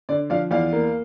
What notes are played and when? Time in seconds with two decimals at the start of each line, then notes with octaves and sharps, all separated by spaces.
0.09 D3 D5
0.30 F3 D5 F5
0.51 E2 D5 F5
0.73 A#3